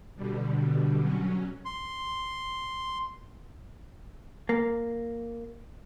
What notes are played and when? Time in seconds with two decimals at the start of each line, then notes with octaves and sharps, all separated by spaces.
0.15 B2 D3 G3
1.00 F#3 C#4
1.65 C6
4.49 A#3